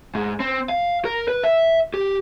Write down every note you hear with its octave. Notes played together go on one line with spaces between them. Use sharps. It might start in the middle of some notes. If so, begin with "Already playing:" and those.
G#2
C4
F5
A#4
B4
E5
G4